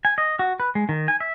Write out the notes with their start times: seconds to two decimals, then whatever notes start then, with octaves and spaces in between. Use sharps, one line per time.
0.05 G#5
0.18 D#5
0.39 F#4
0.60 B4
0.75 G#3
0.89 D#3
1.08 G#5
1.20 E5